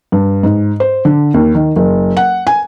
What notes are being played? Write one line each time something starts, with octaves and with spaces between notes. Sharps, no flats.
G2
G#2
C5
D3
D#2
D#3
F#1
F#5
G#5